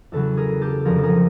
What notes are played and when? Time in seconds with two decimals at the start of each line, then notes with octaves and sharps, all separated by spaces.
0.12 E2 C#3 F#3 A4 B4
0.37 G#4 A#4
0.61 G4 A4
0.85 F2 D3 F3 G#4 A#4
0.98 A4
1.03 G#4 A#4